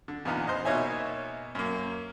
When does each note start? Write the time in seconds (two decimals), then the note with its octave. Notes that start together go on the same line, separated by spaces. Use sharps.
0.08 D3
0.25 E2 A#2 B3 D#4
0.47 C5 D#5
0.65 B2 A#3 D#4 C#5 E5 G#5
1.55 F#2 A#3